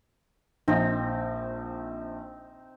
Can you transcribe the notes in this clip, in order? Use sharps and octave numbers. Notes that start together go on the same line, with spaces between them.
A#1 C4 D#4